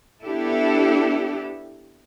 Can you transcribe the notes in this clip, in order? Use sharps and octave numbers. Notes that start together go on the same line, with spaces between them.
B3 D4 E4 G4 A4